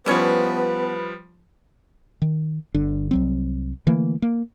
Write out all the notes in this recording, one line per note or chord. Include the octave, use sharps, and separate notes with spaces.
E3 F3 G3 B3 C#4 B4 C#5
D#3
G1 D3 D4
C2 F#3 C4
D3 E3 A3 A#3
A#3